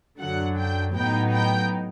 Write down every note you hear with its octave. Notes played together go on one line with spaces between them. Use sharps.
F#2 D3 F#3 F#5
G5
A2 F#3 B3 D#4 G5
G5